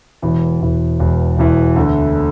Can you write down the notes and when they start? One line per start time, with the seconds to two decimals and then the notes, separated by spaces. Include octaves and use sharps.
0.22 E1 E2 E3
0.61 E1 E2 E3
0.99 E1 E2 E3
1.38 E1 E2 E3
1.76 D2 D3 A3